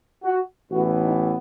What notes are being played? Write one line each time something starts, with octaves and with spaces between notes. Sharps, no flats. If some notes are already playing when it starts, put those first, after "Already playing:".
F#4
A1 A2 E3 B3 F#4
D#4